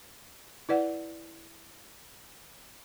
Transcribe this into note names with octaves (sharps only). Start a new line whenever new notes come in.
E4 B4 D5 F#5